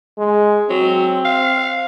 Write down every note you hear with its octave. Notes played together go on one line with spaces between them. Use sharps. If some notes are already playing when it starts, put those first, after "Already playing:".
G#3
F#3 C4
F5